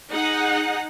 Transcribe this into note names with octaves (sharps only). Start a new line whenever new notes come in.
D#4 G#4 F#5